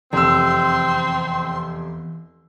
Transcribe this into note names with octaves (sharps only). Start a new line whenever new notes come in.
F1 E2 C4 C6 E6